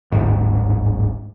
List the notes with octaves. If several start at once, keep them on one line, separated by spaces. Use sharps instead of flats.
D1 G1 G#2